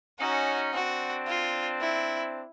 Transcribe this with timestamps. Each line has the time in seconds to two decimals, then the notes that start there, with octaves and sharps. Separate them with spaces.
0.19 C#4 D#4 F#4
0.73 C4 D4 F#4
1.27 F4
1.81 E4